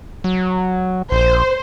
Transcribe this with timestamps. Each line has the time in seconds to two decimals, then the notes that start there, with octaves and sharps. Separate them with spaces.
0.24 F#3
1.12 A#1 C5